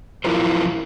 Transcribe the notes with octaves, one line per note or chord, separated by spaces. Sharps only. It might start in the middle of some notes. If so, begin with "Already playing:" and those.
F3 F#3 E4 F4 A#4 C5